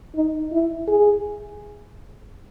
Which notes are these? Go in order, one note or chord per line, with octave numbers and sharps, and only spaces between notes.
D#4
E4
G#4